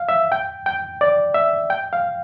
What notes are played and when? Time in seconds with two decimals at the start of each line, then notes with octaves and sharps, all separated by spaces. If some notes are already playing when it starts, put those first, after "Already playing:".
Already playing: F5
0.09 E5
0.32 G5
0.66 G5
1.01 D5
1.34 E5
1.70 G5
1.93 F5